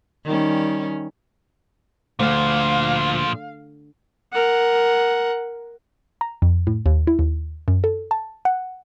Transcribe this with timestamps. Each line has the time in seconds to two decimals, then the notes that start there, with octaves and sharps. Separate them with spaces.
0.25 D#3 G3 C#4
2.19 D2 A#2 F3 F5
4.33 A#4 F#5
6.21 A#5
6.42 F2
6.67 A2
6.86 D#2
7.07 E4
7.19 D#2
7.68 F#2
7.84 A4
8.11 A5
8.45 F#5